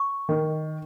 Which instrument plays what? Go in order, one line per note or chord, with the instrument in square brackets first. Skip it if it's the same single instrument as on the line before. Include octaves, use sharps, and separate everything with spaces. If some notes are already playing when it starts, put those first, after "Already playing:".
Already playing: [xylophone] C#6
[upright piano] D#3